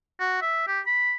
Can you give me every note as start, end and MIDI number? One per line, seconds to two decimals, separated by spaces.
0.20 0.38 66
0.41 0.64 76
0.68 0.80 67
0.86 1.16 83